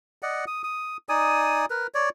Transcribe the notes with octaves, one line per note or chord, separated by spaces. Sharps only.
D5 D#5 F#5
D#6
D#6
D#4 D5 G#5 D#6
A#4 B4
C#5 D5